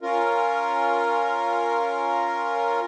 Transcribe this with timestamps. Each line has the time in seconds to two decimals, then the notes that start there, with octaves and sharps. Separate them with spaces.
0.01 C#4 F4 A#4